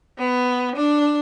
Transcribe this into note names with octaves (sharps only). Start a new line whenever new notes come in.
B3
D4